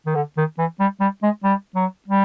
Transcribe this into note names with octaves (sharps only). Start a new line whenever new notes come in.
D#3
D3
D#3
E3
G3
G3
G#3
G3
F#3
G3